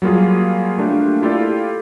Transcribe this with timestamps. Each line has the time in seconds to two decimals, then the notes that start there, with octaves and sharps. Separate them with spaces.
0.02 F#3 G3 A#3 F4 G#4
0.78 A3 A#3 D4 F4 G4
1.22 E4 F4 G4 A4 D5